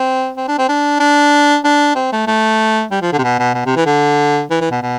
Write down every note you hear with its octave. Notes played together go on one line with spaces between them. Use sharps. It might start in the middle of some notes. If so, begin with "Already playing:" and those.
Already playing: C4
C4
D4
C4
D4
D4
D4
C4
A3
A3
G3
F3
D3
C3
B2
B2
B2
C3
E3
D3
E3
E3
B2
B2